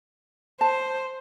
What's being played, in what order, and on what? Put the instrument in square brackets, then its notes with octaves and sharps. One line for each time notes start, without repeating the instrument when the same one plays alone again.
[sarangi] C5 [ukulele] A5